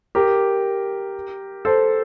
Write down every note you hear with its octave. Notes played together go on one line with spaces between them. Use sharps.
G4 A#4
A4 C5